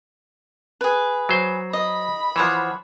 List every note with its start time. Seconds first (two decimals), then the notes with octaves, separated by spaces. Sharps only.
0.81 G#4 B4
1.29 F#3 C5
1.73 D#5 B5
2.36 E3 F3 C5 C#5 F#5